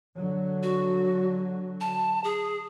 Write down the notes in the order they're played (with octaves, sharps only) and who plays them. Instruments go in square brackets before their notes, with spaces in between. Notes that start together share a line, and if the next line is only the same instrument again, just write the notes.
[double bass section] D3 F#3
[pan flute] F#4
A5
G#4